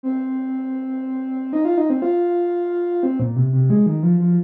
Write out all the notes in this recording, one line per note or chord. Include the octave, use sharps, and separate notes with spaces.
C4
D#4
F4
D#4
C4
F4
C4
A#2
C3
C3
G#3
D#3
F3
F3